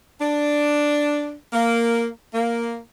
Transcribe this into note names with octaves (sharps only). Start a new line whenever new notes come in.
D4
A#3
A#3